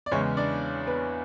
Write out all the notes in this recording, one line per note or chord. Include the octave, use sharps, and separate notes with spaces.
D5
E2 C#3 E3 G#3 C#4 C#5
D4 D5
B3 B4